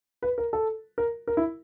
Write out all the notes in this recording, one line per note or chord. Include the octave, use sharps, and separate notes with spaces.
B4
A#4
A4
A#4
A#4
E4